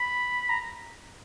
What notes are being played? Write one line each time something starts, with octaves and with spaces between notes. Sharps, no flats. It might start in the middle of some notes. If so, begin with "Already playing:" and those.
Already playing: B5
A#5